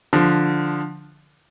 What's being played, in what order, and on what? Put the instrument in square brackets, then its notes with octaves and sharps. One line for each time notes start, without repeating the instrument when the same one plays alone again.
[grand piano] D3 F3